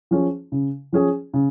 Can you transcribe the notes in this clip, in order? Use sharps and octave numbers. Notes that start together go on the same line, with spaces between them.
F3 C#4 G#4
C#3
F3 C#4 G#4
C#3